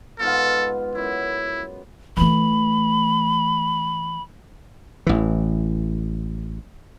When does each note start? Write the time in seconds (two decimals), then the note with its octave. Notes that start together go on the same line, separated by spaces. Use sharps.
0.19 G#2 B3 F4 A4
0.95 F#2 E4
2.17 E3 A3 B5
5.07 A1 E3